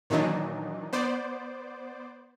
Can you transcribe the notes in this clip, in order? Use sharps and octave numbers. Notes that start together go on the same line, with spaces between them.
A#2 D#3 E3 F#3 D4 D#4
B3 C5 D5